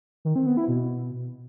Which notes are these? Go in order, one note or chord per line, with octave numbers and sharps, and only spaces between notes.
D#3
C4
B3
E4
B2